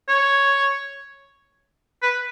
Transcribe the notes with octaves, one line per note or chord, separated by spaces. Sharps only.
C#5
B4